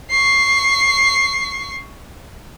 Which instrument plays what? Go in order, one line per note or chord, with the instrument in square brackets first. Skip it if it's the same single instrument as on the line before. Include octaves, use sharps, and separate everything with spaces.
[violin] C#6 C7